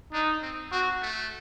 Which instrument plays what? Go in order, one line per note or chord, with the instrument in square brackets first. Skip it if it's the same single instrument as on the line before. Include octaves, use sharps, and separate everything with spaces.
[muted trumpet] D4 [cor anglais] D#4
[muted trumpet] C4
[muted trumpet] C4 [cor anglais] F#4
[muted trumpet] A3